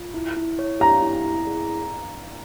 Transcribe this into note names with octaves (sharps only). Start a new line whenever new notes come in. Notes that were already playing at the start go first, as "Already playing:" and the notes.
Already playing: F4
E4
E4
C#5
G4 A#5
E4
E4
G#4